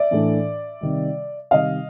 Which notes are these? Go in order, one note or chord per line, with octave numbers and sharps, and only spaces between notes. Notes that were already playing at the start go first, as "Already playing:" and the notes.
Already playing: D5 E5
A2 E3 A3 D4
C3 D#3 G3
C3 D#3 G3 D#5 F5